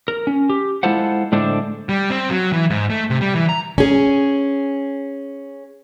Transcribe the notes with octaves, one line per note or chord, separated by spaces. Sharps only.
A#4
C#4
G4
G#3 E4 F4 A4 C5 F#5
A2 D3 G#3 D4 A4 C5
G3
C4
F#3
E3
G#2
A3
C3
G3
E3
A#5
C#4 G#4